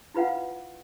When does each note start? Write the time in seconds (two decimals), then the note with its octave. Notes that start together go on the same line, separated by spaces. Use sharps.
0.14 E4 F4 B4 F5 F#5